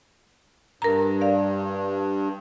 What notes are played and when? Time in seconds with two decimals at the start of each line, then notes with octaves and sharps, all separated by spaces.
0.82 G2 A#4 A#5
1.21 D5 F5